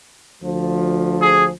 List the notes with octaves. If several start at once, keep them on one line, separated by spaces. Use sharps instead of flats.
D2 F3
G#4